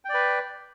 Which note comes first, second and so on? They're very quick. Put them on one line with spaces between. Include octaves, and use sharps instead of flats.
G5 D5 B4